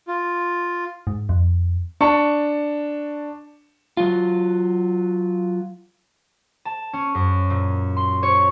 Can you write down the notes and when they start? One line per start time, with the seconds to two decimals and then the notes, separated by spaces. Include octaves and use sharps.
0.08 F4
1.07 G#2
1.29 F2
2.01 D4 A5 C#6 C#7
3.97 F#3 F4
6.65 A5
6.93 C#4
7.15 F#2
7.50 A#2
7.97 C6
8.23 C#5